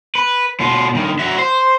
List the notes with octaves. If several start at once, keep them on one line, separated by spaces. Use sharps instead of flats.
B4
B2 F4
G2 D#3
F#4 E5
C5